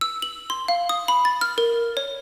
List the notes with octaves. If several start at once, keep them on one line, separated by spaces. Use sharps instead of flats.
E6
F#7
C6
F5
D#6
B5
A6
F6
A#4
C#5